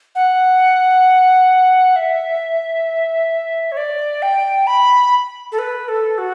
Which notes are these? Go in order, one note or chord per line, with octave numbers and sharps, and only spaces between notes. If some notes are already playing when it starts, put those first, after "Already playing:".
F#5
E5
C#5
D5
G5
B5
A4
B4
A4
F#4